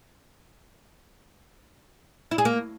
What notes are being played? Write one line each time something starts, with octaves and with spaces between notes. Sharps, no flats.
E4
G#4
A#3